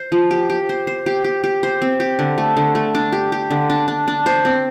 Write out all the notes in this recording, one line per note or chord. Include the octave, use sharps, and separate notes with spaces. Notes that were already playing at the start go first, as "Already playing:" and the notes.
Already playing: C5
F3
G4
G4
C5
C5
G4
G4
G4
C5
C4
G4
D3
A3
D3
A3
D4
G4
G4
D3
D4
D4
D4
C5
C4